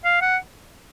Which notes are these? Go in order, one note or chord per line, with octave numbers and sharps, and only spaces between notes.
F5
F#5